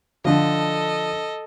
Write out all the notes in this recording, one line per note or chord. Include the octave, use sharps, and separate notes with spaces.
D3 F3 A4 D#5